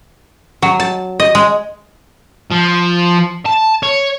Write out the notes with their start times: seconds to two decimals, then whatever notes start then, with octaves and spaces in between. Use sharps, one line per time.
0.62 F#3
0.80 A5
1.20 D#5
1.35 G#3
2.51 F3
3.46 A5
3.83 C#5